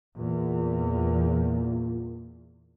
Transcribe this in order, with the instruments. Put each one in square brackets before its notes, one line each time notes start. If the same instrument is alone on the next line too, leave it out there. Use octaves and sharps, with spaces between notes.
[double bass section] E2 [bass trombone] A#2